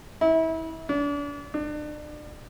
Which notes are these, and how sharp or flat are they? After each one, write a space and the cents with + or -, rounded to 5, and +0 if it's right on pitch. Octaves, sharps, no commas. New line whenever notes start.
E4 -30
D4 -35
D4 +35